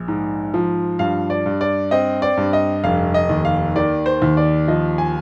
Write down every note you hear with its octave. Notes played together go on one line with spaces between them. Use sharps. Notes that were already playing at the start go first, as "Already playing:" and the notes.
Already playing: A#1
G#2
F3
G2 F5
D5
G2
D5
C4 D#5
D5
G2
D#5
F1 F5
D#5
D#2
F5
D#3 D5
C5
D#2
D5
F3 D#5
G#5